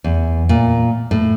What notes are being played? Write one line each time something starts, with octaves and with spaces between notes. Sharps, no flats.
E2
A#2
A2